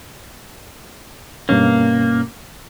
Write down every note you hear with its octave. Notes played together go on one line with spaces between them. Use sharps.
G2 B2 A#3 C#4